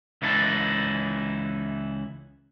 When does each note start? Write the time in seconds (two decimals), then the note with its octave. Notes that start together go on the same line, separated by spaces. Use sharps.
0.22 C#2 E3 D#4 E4 A5